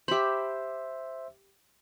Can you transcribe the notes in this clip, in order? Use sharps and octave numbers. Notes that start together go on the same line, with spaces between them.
G4 C5 E5 B5